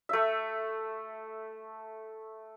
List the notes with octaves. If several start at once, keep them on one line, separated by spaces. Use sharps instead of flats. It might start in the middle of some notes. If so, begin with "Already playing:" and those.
A3 E5